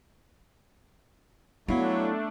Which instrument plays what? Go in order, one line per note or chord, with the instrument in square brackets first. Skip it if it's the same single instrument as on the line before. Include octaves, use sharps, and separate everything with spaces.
[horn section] F#3 [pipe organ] A3 D4 [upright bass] B3 [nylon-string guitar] E4 F5